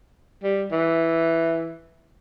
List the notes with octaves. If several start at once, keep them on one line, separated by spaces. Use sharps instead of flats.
G3
E3